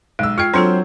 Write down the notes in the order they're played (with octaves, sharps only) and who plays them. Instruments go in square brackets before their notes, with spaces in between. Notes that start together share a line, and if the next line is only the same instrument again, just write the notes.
[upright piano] B1 E6 [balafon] G#3
[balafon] F4 G5 [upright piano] F6 G#6 C7
[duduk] F#3 [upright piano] C4 C5 G#6 [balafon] D4 F4 A4